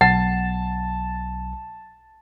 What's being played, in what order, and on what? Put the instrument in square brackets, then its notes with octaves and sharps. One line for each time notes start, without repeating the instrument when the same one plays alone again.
[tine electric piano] B1 [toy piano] F#5 [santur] A5